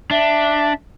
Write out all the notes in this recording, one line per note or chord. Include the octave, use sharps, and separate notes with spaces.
D4 E5